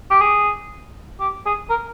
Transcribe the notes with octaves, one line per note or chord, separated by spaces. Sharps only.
G4
G#4
G4
G#4
A#4